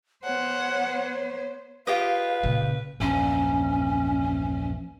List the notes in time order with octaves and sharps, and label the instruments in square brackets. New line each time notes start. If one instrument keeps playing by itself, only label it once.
[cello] B3 C5 [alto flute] C#5 [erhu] F#5
[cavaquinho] F4 G4 D#5 [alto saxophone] B4 [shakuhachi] F5
[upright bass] A#2 C#3
[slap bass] A#1 E2 G2 [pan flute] C#4